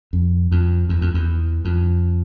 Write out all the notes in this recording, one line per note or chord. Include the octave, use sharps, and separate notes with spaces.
F2
F2
E2
F2
E2
F2